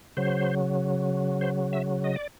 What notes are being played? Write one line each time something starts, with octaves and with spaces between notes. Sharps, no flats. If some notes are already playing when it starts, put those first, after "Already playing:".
C#3 F#3 C5
C5
E5
D#5
D5